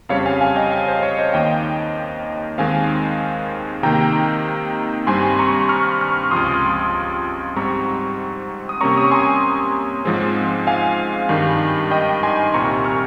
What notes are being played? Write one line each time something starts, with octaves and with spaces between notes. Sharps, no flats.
F2 C#3 G3 C4 C#5 F5
F5 G#5
F5 G#5
D#5 G5
F5 G#5
C5
C#5
C5 D#5
D#2 D#3 A#3 D#5 G5
D#2 D#3 G#3 C4 F5 G#5
C3 D#3 A#3 G5 A#5
G2 G3 C4 G#5 C6
A#5 C#6
C#6 F6
C#6 F6
C#2 C3 F3 C6 D#6
G#2 G3 C4 A#5 C#6
D#6
C3 G3 A#3 C#4 A#5 C#6
D#6
C#6
G#5 C6
G#2 F3 G#3 C4
F5 G#5
G2 D#3 G3
D#5 G5
G#5 C6
C2 A#2 G3 C4 A#5 C#6
C#6 F6